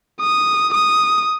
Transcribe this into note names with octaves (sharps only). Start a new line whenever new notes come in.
D#6
D#6